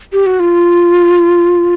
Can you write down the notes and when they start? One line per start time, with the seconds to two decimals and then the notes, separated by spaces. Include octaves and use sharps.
0.13 G4
0.26 F#4
0.40 F4